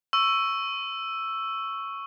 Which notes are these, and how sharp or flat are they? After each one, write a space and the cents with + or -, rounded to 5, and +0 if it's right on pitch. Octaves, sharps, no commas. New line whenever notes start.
C#6 +0 E6 +5